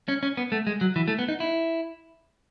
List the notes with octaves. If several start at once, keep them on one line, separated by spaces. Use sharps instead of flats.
C#4
C#4
B3
A3
G#3
F#3
E3
A3
B3
D#4
E4